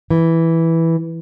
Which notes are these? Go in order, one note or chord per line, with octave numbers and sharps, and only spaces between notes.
E3